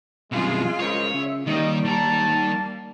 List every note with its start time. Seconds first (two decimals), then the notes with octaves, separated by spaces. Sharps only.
0.32 C2 F#2 B2 G#3 F4 G#4
0.79 C#2 A#4 C5 C#5 D#5
1.14 C#3 E5
1.46 D#2 D#3 G3 A#3 D#4 D#5
1.84 D#3 A5 A#5
2.27 G3 A#3